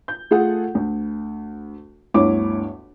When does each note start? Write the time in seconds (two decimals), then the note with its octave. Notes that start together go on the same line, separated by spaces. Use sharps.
0.08 G6
0.31 A3 F4 G#4 A4 F#5
0.75 D2
2.14 G1 D2 E4 C#5 D6